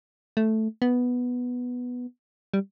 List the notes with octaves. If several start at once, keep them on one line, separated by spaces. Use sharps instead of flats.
A3
B3
G3